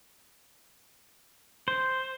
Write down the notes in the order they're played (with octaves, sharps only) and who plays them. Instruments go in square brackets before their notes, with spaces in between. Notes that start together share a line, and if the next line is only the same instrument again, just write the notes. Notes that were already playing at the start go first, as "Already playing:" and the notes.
[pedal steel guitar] C5